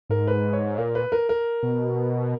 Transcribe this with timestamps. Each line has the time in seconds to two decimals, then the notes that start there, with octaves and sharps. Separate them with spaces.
0.09 G#2 A#4
0.27 B4
0.53 C#5
0.78 A#2 A#4
0.95 B4
1.12 A#4
1.29 A#4
1.63 B2